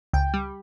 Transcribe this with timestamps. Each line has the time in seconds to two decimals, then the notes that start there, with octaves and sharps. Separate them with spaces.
0.13 C#2 G5
0.34 G3